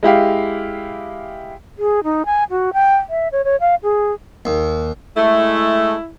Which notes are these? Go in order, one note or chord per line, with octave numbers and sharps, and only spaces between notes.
G#3 E4 G4 F5
G#4
D#4
G#5
F#4
G5
E5
C#5
C#5
F5
G#4
D#2
G#3 A3 E4